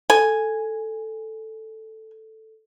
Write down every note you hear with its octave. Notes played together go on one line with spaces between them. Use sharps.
A4 G#5